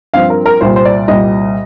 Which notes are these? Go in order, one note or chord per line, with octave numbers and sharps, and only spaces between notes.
G2 F3 C4 F5
A#4
A#4
C2 A#2 G3 C5
C5
D5
C2 A#2 G3 D#5